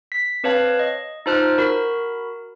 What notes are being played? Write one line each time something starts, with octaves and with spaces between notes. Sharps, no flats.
B6
C4 B4 C#5 F5 A5
D#5
D#4 F4 C5 A5 F6 F#6
F#4 A#4 B5